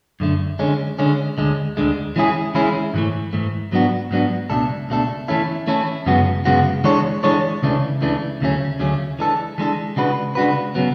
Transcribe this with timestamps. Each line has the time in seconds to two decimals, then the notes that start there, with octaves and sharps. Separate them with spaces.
0.20 F#2 D3 A3
0.59 D3 G#3 C#4
0.99 D3 G#3 C#4
1.38 D2 D3 G#3
1.77 D2 D3 G#3
2.16 E3 G#3 C#4 E4 G#4
2.55 E3 G#3 C#4 E4 G#4
2.94 G#2 E3 A3
3.33 G#2 E3 A3
3.72 G#2 F#3 B3 D4 F#4
4.11 G#2 F#3 B3 D4 F#4
4.50 C#2 B2 A3 D4 A4
4.89 C#2 B2 A3 D4 A4
5.28 E3 A3 C#4 E4 A4
5.67 E3 A3 C#4 E4 A4
6.06 F#2 C#3 G#3 B3 F#4
6.45 F#2 C#3 G#3 B3 F#4
6.84 E3 G#3 D4 A4 C#5
7.23 E3 G#3 D4 A4 C#5
7.63 C#2 C#3 E3 A3 D4
8.01 C#2 C#3 E3 A3 D4
8.41 D2 C#3 F#3 A3 C#4
8.79 D2 C#3 F#3 A3 C#4
9.19 E3 G#3 D4 A4
9.58 E3 G#3 D4 A4
9.96 C#3 G#3 D4 F#4 B4
10.35 C#3 G#3 D4 F#4 B4
10.75 C#3 F#3 B3